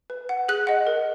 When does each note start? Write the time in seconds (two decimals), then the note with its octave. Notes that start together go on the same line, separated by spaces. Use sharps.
0.10 B4
0.29 F#5
0.49 G#4 F#6
0.67 D#5 F#5
0.87 A#4